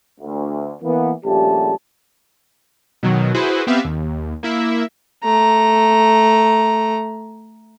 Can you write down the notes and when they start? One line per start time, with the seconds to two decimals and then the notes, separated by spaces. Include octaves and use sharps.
0.20 D2
0.82 E3 A#3 B3
1.25 A#1 C#3 G3 A3 G4 A5
3.03 B2 D#3 F#3
3.35 E4 F#4 G#4 B4 C5
3.67 B3 C4 G4 B4 E5 F5
3.84 D#2
4.43 A#3 E4 E5
5.24 A3 A#5